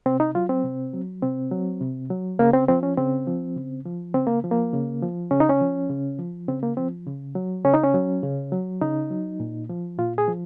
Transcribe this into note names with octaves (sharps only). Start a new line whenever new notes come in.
C3 C4
D#4
F#3 F4
C4
C3
F#3
C3 C4
F#3
C3
F#3
C#3 A#3
C4
F3 C4
C#4
C#3 C4
F3
C#3
F3
C#3 C4
A#3
F3
A#3
C#3
F3
C#3 C#4
D#4
C#4
F3
C#3
F3
C#3 C4
A#3
F3 C4
C#3
F#3
C#3 C#4
D#4
C#4
F#3
C#3
F#3
C#3 D#4
F#3
A#2
F3
A#2 F4
G#4
F3